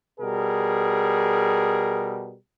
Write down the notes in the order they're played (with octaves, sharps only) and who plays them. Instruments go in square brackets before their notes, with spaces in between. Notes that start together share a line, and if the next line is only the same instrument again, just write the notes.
[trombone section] B2 G3 G#4 A#4